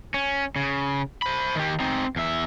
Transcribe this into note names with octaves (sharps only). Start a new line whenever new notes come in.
C#4
C#3
C5 B5
D#3 G4
C4 D#4
E2 E5